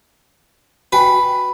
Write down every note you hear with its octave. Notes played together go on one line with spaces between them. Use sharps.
F#4 B4 G5 G#5